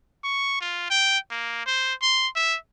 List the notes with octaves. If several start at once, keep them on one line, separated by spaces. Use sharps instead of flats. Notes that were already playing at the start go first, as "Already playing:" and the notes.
C#6
F4
G5
A#3
C5
C6
E5